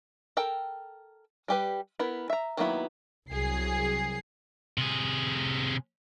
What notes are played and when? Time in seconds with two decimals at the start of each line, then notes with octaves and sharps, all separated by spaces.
0.37 A4 A#4 G5
1.48 G3 G4 B4
1.99 B3 E4 A#4
2.30 E5 A#5
2.57 D#3 F#3 A#3 B3 E4
3.32 C2 F#3 G#4 C7
4.78 C3 G#4